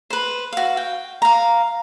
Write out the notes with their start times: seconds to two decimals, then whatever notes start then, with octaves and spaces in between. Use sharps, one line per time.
0.10 B4 C5
0.53 F#4 F5
0.77 G5
1.22 F5 A#5